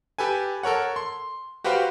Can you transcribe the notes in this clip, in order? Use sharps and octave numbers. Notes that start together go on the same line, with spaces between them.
G4 A4 B4 G#5
A4 A#4 C#5 F#5
C6
F#4 G4 B4 C5 F5 G5